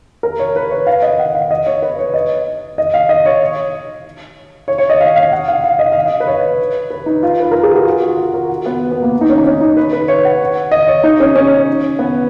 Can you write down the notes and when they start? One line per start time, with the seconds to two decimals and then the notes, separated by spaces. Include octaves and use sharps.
0.23 A#4
0.39 C#5
0.56 B4
0.71 C#5
0.87 F5
1.02 D#5
1.19 F#5
1.35 F5
1.51 D#5
1.67 C#5
1.82 B4
1.99 C#5
2.14 D#5
2.78 D#5
2.94 F5
3.09 D#5
3.26 C#5
4.68 C#5
4.78 C#5
4.89 D#5
5.01 F5
5.16 F5
5.32 F#5
5.48 F5
5.64 F5
5.79 D#5
5.92 F5
6.06 D#5
6.20 B4
6.27 C#5
6.90 B4
7.06 D#4
7.23 F4
7.40 B4
7.51 A#4
7.63 G#4
7.74 F#4
7.86 F4
8.02 F#4
8.18 F#4
8.34 A#4
8.49 F#4
8.66 B3
8.91 B3
9.02 A#3
9.21 D#4
9.30 C#4
9.38 D#4
9.45 C#4
9.61 D#4
9.77 B4
9.93 B4
10.08 C#5
10.25 F#5
10.72 D#5
10.88 C#5
11.03 D#4
11.20 C#4
11.36 C#4
11.99 B3